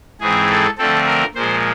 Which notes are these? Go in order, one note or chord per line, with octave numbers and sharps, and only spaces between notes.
G#2 E3 G#3 C4 G#4
A4
D3 F3 A3 C4 A4
A#4
A#2 F3 G#3 C5